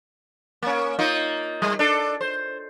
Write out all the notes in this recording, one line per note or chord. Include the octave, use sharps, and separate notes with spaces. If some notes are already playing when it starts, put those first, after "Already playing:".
A#3 C#4
A#3 D#4 F4
G3
D4 A4
C5